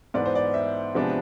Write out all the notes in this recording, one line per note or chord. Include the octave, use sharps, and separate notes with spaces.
G#2 E3 B3 D5
C5
D5
E5
C3 F3 G#3 B3 D4